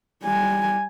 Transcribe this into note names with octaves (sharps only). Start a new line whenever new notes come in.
G3 G#5